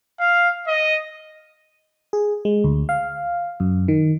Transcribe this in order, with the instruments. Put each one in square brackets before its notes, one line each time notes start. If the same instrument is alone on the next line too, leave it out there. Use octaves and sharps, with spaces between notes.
[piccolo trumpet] F5
D#5
[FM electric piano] G#4
G#3
D2
F5
F#2
D#3